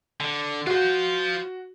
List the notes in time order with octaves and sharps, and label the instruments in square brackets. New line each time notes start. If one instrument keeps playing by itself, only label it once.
[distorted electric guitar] D3
[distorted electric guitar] F4 C5 [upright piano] F#4